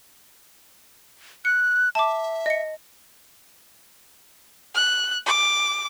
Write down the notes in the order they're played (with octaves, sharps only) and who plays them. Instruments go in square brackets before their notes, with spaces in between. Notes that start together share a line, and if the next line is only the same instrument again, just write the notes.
[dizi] F#6 [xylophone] C#7
[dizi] E5 [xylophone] A5 D6
[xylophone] D#5 C#7
[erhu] F#6
D6